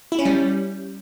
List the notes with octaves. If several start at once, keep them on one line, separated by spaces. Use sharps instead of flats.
E4
C#4
G3